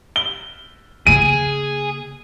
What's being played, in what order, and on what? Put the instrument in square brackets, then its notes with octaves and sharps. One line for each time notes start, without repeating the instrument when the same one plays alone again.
[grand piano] G7
[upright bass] C#3 A#3 [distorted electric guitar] G#4 [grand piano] D#7